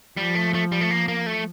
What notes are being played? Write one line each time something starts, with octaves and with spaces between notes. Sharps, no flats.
F3 G3
A3
A3
G3
A3
A#3
A#3
A3